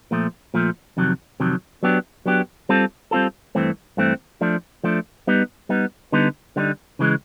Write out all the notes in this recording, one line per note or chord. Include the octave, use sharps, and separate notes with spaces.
A#2 F3 A3
A#2 F3 A3
F2 C3 D#3 F#3
F2 C3 D#3 F#3
F#3 B3 D4 G4
F#3 B3 D4 G4
G3 C4 F4 A4
G3 C4 F4 A4
G2 E3 A3 C4
G2 E3 A3 C4
F3 A3 D4
F3 A3 D4
G3 B3 D#4
G3 B3 D#4
D3 G3 B3 D#4
D3 G3 B3 D#4
C#3 E3 G#3